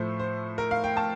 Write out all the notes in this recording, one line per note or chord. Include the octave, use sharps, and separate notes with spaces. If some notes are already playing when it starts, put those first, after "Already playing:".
Already playing: A2 F3 A3 C5
C5
A#4
F5
G5
A5